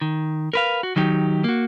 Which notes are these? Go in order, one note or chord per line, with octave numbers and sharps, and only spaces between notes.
D#3
A#4 B4 F5
F#4
D#3 F#3 D#4 G4
A#3 F#4